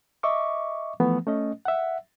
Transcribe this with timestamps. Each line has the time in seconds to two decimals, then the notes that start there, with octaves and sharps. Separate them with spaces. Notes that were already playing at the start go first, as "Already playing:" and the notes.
0.23 D#5 E5 C#6 D6
1.00 E3 F3 A3 B3
1.27 A3 C#4 D#5
1.65 E5 F#5